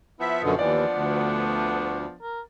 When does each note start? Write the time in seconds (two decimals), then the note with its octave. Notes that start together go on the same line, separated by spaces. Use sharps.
0.20 F3 B3 E4 E5
0.42 F#2 B2 D3 D#5
0.59 D#2 E3 D4 D5
0.94 D2 D4
2.22 A#4